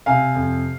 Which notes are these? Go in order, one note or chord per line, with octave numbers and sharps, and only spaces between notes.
C3 F5 G#5
F2